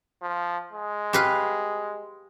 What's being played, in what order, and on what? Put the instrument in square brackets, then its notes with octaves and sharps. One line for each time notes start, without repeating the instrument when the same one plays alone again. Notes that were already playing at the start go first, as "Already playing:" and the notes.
[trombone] F3
G#3
[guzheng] G4 B4 F5